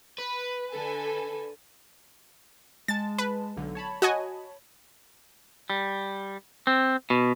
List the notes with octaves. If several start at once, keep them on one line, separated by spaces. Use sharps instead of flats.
B4
D3 A4 G#5
G#3 A5 A6
B4
B1 D3
C#5 A5 B5
F#4 D#5 G#5
G3
C4
B2